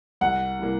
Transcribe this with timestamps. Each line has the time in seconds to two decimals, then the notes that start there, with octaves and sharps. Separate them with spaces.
0.21 C2 F#5
0.58 C3 E3 G3 A#3